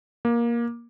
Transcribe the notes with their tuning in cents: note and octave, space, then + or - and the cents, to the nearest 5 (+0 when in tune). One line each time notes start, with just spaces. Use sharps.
A#3 +15